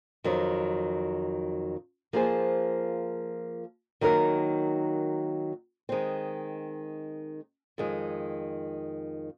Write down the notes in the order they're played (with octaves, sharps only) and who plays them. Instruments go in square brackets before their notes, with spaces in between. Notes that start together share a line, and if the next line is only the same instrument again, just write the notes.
[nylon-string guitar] F2 D#3 F#3
F3 A#3 F4 G#4 C5
D#3 F#3 A#3 D#4 A#4
D#3 G#3 C4
F2 D#3 G#3